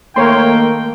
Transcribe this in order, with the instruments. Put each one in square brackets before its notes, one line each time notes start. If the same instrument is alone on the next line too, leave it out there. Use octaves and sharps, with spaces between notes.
[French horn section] D#3 A3 A#3 [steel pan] A#4 C#5 C6 [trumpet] G5